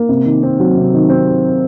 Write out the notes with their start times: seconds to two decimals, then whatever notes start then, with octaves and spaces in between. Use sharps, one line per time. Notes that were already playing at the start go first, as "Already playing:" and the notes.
Already playing: A#3
0.09 C3
0.26 D#3
0.43 C4
0.60 F#3
0.77 C3
0.94 D#3
1.10 C4